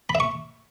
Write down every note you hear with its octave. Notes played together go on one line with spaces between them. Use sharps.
B5
E5
C#6